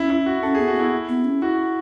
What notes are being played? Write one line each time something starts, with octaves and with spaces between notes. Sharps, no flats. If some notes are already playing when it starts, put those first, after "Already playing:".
Already playing: C#4 E4
E4
F#4
C#4 A4
G#4
B3
F#4
B3 E4
B3
C#4
E4 F#4